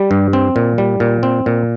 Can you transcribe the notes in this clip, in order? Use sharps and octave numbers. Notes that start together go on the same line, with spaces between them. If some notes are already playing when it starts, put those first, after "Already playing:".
Already playing: G3
G2
C4
A#2
G3
A#2
C4
A#2